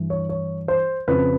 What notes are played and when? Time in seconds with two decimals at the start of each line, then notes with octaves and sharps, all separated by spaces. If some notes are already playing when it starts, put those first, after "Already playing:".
Already playing: G2 E3
0.10 C#5
0.29 C#5
0.68 C5
1.08 F2 C#3 F3 B4